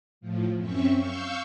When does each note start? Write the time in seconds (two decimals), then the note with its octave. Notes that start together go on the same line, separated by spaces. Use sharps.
0.21 A2 F3
0.57 F#2 C4 C#4 E5 C#6
0.95 F5 C#6 E6 G6